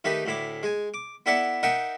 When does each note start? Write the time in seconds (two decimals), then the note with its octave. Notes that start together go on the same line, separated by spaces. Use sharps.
0.04 D#3 A3 D#4 G4 B4
0.25 D2 A2 E4 D6
0.63 G#3 G#5
0.94 D6
1.26 B3 E4 A4 D5 E5 F#5
1.63 D#4 A#4 D#5 E5 F#5 G5